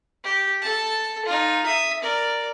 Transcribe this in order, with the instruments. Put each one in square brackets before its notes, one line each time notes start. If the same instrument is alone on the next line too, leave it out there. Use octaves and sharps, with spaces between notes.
[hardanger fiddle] G4
A4 A5
D#4 F4
E5 D#6
A#4 D5